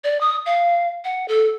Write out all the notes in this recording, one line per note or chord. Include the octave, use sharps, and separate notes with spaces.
D5
D#6
F5
F#5
A4